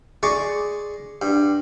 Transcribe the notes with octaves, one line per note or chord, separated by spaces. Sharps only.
G#3 D5 C#6
G2